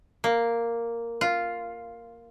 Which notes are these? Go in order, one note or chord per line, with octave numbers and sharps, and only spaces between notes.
A#3
F4